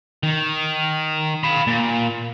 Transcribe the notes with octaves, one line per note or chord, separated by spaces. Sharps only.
D#3
F5 B5
A#2